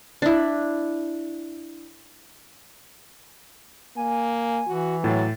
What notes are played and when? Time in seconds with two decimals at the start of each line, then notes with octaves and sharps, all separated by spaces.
0.22 D4 E4
3.96 A#3 G#5
4.67 E3 F#4
5.04 A2 F#3 A6